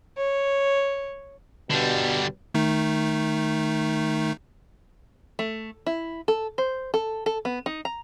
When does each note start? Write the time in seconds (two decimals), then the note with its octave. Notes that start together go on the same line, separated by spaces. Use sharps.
0.17 C#5
1.70 G2 B2 D3 G3
2.54 D#3 A3 D#4
5.39 A3
5.86 E4
6.28 A4
6.58 C5
6.94 A4
7.26 A4
7.45 B3
7.66 D#4
7.85 A#5